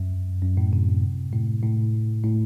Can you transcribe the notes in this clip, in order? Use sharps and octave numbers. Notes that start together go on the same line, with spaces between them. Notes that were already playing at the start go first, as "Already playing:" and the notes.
Already playing: F#2
F#2
A2
C3
A2
A2
A2